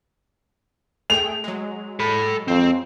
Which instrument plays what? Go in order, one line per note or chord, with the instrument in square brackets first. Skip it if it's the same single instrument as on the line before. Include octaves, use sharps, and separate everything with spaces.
[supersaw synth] A3 G#4 G5 [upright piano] F7
[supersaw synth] F#3 G#3
[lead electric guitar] A4 B5
[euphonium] F2 [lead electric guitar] C4